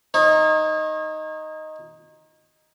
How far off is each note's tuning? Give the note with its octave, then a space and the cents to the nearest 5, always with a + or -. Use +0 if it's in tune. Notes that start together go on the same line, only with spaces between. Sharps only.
D#4 +0 C#5 -40